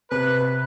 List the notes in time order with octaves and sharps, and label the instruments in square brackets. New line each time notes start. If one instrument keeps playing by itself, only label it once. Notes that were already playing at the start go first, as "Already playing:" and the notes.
[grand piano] C3 [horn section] B4